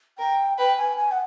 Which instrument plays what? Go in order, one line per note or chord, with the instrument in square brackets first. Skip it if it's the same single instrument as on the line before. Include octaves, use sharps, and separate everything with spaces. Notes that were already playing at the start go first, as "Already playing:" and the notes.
[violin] A#4 [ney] G5
[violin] B4 [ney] G5
[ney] G#5
G#5
F#5